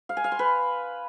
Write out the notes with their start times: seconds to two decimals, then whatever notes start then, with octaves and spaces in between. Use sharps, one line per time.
0.09 F5
0.17 G#5
0.24 F5
0.32 C6
0.39 B4